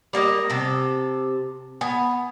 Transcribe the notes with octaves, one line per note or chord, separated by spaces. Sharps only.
G3 A#3 D4 D#5
C3 A4
B3 G#5